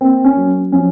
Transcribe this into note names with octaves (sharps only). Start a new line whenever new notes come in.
A#3 C4
C#4
F#3
F3 C#4